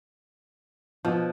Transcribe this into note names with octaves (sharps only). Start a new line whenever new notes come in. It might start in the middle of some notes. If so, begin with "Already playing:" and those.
B2 F3